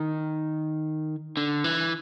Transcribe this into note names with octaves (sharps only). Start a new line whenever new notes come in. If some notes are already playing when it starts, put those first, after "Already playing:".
Already playing: D#3
D3
E3